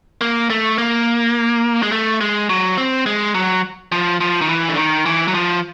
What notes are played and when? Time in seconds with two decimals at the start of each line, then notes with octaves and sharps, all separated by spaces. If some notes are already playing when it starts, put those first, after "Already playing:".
0.21 A#3
0.50 A3
0.78 A#3
1.83 G#3
1.92 A3
2.21 G#3
2.49 F#3
2.78 C4
3.06 G#3
3.35 F#3
3.92 F3
4.21 F3
4.41 D#3
4.49 E3
4.69 D3
4.77 D#3
5.06 E3
5.28 F#3
5.35 F3